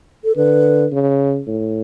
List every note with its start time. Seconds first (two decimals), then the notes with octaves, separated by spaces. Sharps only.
0.24 A4
0.36 D3 B4
0.92 C#3
1.47 A2